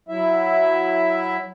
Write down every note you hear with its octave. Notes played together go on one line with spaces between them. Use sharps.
F#3 E4 E5